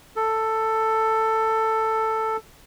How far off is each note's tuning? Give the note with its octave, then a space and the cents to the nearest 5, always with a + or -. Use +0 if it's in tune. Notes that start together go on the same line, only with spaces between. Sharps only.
A4 +10